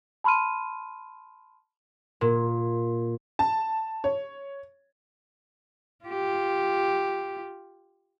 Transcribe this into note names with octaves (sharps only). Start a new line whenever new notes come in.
A5 B5 C6 F6 D#7
A#2
A5
C#5
F4 G4